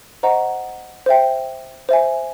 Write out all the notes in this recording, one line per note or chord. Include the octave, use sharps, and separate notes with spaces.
C5 D#5 F#5 A#5 C#6
C5 E5 G5
C5 E5 G#5